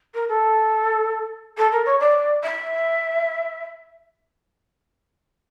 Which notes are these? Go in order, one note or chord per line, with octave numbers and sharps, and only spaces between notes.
A#4
A4
A4
A#4
C#5
D5
E5